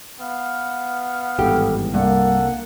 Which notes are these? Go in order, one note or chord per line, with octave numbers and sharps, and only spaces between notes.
B3 F5 F#5
G#1 E2 G2 G4 A4
C2 G2 A#3 A4 F#5